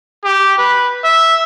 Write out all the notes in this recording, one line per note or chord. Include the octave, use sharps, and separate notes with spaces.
G4
B4
E5